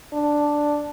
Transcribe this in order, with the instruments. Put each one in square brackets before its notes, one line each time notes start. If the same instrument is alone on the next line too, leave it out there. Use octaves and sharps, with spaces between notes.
[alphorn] D4